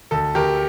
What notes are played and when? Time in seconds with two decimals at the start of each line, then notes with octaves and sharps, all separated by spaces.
0.11 D2 A4
0.35 D2 G4 A#4